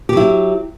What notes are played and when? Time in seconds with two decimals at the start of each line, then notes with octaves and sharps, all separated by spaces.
0.09 G4
0.13 F#3
0.17 E4